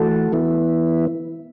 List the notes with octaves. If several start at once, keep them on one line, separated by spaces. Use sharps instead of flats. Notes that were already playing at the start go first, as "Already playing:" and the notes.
Already playing: E3 A3 F#4 A4
E3 B3 E4